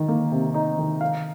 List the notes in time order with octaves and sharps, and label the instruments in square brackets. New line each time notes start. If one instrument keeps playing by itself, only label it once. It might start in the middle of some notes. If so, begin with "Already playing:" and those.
Already playing: [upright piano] D#3
A#3
C3
D#4
D#3
F5